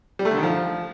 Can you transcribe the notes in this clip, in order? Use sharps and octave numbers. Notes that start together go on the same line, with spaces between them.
G3
A3
D3
D#3
F3